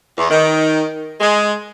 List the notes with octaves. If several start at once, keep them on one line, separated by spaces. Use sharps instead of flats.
E2
D#3
G#3